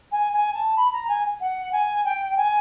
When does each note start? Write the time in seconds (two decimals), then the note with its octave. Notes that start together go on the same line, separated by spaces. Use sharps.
0.11 G#5
0.33 G#5
0.54 A5
0.76 B5
0.92 A#5
1.08 G#5
1.40 F#5
1.72 G#5
2.04 G5
2.37 G#5